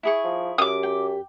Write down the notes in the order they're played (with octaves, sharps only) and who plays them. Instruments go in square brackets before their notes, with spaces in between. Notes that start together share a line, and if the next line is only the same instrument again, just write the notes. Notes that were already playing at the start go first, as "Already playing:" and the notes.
[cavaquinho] E4 G#4 C#6
[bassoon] F3
[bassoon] F#2 [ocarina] G4 [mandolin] D6 D#6
[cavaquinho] G5